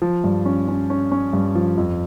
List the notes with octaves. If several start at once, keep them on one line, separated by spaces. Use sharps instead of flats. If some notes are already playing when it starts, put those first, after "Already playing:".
F3
G2
C#4
C#4
C#4
C#4
G2
F3
F2